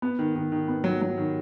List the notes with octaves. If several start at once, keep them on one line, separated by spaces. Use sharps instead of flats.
B3
D#3
D#3
D#3
B3
F#3
F#3
D#3